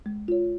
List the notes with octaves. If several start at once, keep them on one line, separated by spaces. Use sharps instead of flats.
G#3
F4 C#5